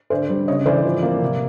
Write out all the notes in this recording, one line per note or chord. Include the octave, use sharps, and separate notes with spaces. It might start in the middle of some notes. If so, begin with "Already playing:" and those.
D3 C5 D5
G3
C#3 C#5 D#5
E3 C5 D5
F3
A#3
C3